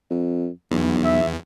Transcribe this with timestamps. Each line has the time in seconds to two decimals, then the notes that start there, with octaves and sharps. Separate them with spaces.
0.11 F2
0.71 B1 E2
1.04 E5